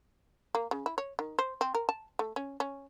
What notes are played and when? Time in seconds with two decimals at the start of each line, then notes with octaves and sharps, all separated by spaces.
0.55 A#3
0.71 C#3
0.86 E4
0.98 C#5
1.19 D#3
1.39 C5
1.61 C4
1.75 A#4
1.89 A5
2.19 A3
2.36 C#4
2.60 C#4